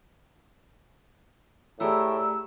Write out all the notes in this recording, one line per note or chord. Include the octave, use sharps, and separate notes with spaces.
A2 A3 G4 G#4 D5 A#5 E6